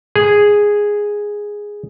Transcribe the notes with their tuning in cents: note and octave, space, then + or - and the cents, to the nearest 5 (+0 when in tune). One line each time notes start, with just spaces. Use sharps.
G#4 -5